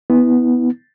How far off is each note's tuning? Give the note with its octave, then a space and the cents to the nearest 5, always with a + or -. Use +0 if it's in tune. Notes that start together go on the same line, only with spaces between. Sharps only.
B3 +0 E4 -25